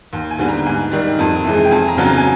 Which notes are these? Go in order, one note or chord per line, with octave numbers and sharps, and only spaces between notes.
D#2
G#5
D3 G3 B3
A#5
G#2 G#5
D#3 G3
F2
C3 E3 G#3
G5
F2 G#5
A#5
C#3 F#3 B3
A#5
G#5